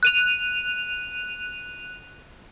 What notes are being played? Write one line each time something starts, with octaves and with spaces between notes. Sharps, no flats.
F#6 D#7 F7